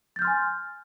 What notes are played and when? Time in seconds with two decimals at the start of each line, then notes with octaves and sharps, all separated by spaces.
0.16 A6
0.19 G6
0.22 F6
0.25 C6
0.27 G#5